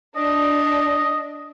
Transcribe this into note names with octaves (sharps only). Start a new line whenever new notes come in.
D4 D#5